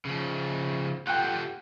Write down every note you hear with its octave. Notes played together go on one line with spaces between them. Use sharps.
C#3 F3
F4 G4 A4 F#5 G5